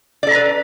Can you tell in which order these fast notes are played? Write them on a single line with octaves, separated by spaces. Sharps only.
D5 A4 A#5 B4